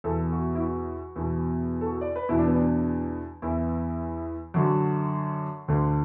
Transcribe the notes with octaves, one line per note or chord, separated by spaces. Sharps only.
E2 B2 A4
F#4
E4
F#4
E2 B2
A4
F#4
D5
B4
E2 B2 E4
D4
B3
D4
E2 E3 E4
F#2 D3 F#4
D2 D3